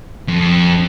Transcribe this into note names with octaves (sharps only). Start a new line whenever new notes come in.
F2